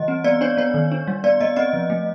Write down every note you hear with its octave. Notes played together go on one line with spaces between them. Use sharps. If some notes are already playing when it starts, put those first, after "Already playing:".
Already playing: E3 G3 D#5
C4
B3 D5
D4 C#5
B3 C#5
D#3
D4
G3
B3 D5
B3 D#5
C4 D#5
F3
A3